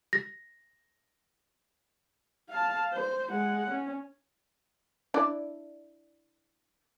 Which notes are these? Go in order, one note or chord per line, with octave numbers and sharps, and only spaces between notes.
A#6
F5 A5
C5
G#3 F#5
C#4
D4 E4 D5